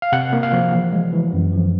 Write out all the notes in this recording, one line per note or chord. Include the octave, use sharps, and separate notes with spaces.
F5
C3 F#5
A#3
F5
F3
E3
G#3
E3
F#2
F3